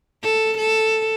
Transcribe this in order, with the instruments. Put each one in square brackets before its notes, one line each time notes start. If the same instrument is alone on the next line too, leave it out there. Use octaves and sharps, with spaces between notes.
[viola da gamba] A4
A4